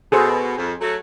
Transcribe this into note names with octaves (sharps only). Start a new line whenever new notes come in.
B2 G#4 A4 C5
F2
F#3 A3